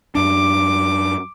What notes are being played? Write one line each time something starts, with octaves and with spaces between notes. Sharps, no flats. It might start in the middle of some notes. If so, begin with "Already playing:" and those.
F#2 D4 D6